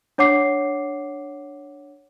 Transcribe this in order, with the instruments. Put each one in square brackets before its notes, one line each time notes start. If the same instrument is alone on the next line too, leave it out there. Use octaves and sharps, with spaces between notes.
[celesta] D4 C#5 F#5 D6 C7